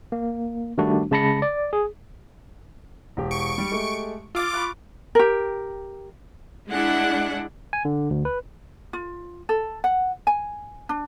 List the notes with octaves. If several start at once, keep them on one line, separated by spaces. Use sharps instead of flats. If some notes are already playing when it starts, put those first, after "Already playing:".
A#3
D#3 G3 A3 D4 F#4
C#3 G#3 A5 B5 A#6 C#7
D5
G#4
E1 G4
C#6 C#7 D7
G3
G#3 A3 G4
F4 D6 E6 F6 A6
B5 C#6 F#6
G4 A#4
G#3 D4 E4 F#5
G#5
D3
D2
B4
F4
A4
F#5
G#5
D4